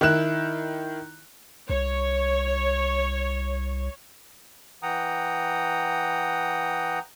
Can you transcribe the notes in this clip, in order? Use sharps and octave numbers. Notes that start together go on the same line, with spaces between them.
D#3 E4 F#6 E7
C2 C#5
E3 F#5 G5 A#5 D#6